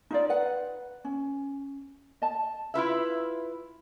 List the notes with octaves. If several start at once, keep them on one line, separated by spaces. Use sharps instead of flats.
D#4 F4 D5
B4 F#5
C#4
D#5 A5
E4 F4 B4 E5